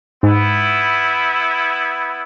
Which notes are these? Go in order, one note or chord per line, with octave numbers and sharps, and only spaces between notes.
G#2 B3 E4